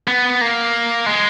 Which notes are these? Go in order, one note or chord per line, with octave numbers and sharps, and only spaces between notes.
B3
A#3
G#3